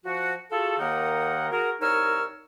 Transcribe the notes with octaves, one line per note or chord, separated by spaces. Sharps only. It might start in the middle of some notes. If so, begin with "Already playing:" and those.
F3 F#4
F4 F#4 G#4 A4
D#2 D#3 A#3 D#4 A#4 F#5
F#4 G#4 A#4
C2 D#4 A#4 C#5 E6 F6